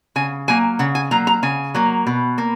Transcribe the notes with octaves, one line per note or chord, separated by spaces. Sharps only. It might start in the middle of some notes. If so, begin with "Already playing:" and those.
C#3 G#5
F#3 A#3 G#5
C#3 F#5
G#5
F#3 A#3 A#5
A#5
C#3 G#5
F#3 A#3
B2
A#3